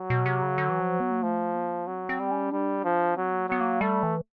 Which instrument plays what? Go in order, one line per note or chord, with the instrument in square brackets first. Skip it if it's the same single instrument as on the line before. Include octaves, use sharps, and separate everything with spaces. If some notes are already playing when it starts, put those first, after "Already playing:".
Already playing: [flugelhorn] F#3
[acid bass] B2
C3
C#3
D3
E3
F3
B3
A#3
[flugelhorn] F3 [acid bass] A3
[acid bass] A#3
[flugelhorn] F#3 [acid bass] C4
[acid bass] C4
[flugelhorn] G3
[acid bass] C#4
[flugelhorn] G3 [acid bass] D4
[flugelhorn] F3
[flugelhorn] F#3 [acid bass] C4
[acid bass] B3
A#3
[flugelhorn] F#3 [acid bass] B3
[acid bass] A#3
[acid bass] G3 [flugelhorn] A3
[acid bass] E3